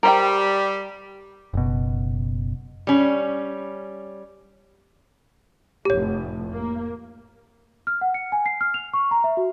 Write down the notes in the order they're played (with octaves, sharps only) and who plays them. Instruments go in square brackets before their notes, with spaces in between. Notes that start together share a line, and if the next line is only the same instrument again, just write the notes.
[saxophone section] G3 [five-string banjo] A#4 C5 G5
[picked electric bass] F#1 B2
[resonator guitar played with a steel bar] G3 C#4
[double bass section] F1 A2 [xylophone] G4 C#5
[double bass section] A#3
[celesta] F6
F#5
C#7
G#5
C7
F6
F7
C#6
A#5
E5
F#4